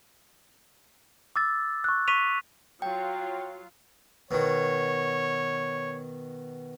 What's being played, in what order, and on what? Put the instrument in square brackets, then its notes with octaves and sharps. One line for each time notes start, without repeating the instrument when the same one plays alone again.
[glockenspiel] D6 E6 A6
C#6 F#6
C#6 B6 D#7 F7
[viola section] F#3 F4 [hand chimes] G5
[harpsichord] B2 D#3 [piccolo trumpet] C#5